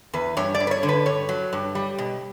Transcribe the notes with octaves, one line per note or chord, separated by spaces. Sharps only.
E2 B4
G2 C#5
D5
G2
B4
C#5
D3
B4
G2 C#5
F#3
G2
G3
B2